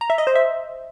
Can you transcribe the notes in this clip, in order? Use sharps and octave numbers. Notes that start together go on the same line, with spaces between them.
A#5
E5
D#5
C5
E5